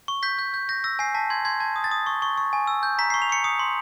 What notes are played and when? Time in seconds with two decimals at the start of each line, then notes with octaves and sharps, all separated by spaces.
0.08 C#6
0.23 G6 B6
0.39 G6
0.54 G6
0.69 G6 A#6
0.84 E6 A#6
0.99 G#5 C7
1.15 A5 B6
1.30 C6 G#6
1.45 C6 G#6
1.60 A5 G#6
1.76 D#6
1.84 A6
1.91 D#6
2.06 C#6
2.22 C#6
2.37 C#6
2.53 G#5
2.67 E6
2.83 G6
2.98 A#5 B6
3.10 C7
3.14 C#6
3.22 F7
3.30 C#6 C#7
3.44 D#6 C#7
3.59 C6